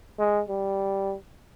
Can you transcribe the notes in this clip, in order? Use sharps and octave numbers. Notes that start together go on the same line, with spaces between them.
G#3
G3